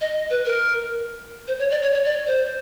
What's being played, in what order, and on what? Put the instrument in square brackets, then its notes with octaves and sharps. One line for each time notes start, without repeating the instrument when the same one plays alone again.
[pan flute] D#5
B4
A#4
C5
C#5
D5
C#5
C#5
D5
C5